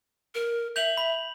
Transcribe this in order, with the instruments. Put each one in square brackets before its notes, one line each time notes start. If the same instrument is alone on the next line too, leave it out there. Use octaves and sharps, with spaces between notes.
[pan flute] A#4
[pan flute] E5 [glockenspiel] G6 F7 F#7
[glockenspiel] B5